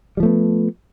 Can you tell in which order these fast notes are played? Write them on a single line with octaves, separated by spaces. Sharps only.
G3 F3 A3 B3